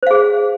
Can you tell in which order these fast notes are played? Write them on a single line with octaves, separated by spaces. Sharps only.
C5 F5 G#4